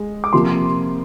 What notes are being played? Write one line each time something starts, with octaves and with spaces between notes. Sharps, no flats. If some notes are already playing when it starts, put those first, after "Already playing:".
Already playing: G#3
D6
C3 F3 A#3 C6